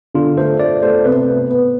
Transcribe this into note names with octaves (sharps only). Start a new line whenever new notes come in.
D3 F4
A3 C5
A3 D5
A3 C5
C3 B4
B3
B3